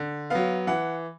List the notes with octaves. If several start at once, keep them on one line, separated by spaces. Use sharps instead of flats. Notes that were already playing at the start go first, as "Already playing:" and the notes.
Already playing: D3
F#3 B3 F5
E3 F#5